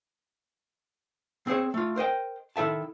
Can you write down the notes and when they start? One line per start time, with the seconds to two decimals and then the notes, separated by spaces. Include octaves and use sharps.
1.47 C4 G#4 C5 C#5
1.74 A3 F4
1.96 A#4 C5 D#5 G5
2.56 D#3 E4 A4 E5 A5